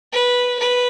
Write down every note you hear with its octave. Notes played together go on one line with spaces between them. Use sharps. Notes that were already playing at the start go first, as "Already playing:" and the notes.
B4
B4